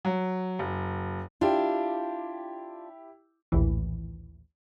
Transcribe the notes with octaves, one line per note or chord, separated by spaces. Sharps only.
F#3
F#1
D4 E4 F4 G4 G5
A#1 D#2 A2 E3